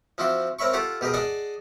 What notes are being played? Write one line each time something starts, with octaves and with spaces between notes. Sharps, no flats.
F3 C4 E4 F#4 C6
C4 A#4 C#5 E5 B5 C#6
F4 G4 A4 F5 F#5
B2 G4 G#4 A#4
G#4 D5 D#5 F#5 G#5 A5